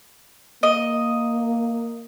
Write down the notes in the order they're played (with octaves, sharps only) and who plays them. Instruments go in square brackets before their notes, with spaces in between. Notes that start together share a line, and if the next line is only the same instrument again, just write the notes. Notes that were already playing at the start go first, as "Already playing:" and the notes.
[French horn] A#3 [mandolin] D#5